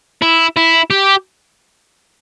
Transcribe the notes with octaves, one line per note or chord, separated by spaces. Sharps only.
E4
E4
G4